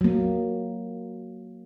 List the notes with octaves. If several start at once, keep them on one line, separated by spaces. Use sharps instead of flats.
F#3 A#3